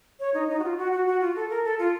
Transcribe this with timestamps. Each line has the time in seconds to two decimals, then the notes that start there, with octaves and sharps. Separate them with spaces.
0.20 C#5
0.34 D#4
0.49 D#4
0.59 F#4
0.64 F4
0.78 F#4
0.93 F#4
1.07 F#4
1.21 F4
1.36 A4
1.50 A#4
1.65 A4
1.79 F4